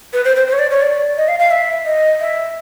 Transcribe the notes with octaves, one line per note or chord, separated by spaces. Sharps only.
B4
C5
C5
C5
C#5
D5
C#5
D5
D#5
F5
F5
E5
D#5
E5